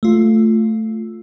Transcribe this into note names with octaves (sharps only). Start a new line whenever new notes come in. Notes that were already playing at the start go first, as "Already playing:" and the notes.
A3 F4